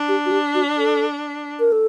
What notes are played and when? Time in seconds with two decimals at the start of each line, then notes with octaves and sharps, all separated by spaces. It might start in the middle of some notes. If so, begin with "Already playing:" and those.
Already playing: D4
0.08 G4
0.26 F#4
0.31 G4
0.55 F#4
0.78 A4
1.60 A#4
1.72 A4